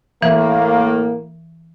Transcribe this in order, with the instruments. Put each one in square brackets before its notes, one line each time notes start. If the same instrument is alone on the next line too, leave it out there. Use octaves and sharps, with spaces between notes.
[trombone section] A2 A#3 [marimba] E3